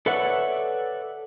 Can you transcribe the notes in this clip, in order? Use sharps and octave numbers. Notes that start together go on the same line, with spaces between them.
A4 B4 C#5 D5 E5 F#5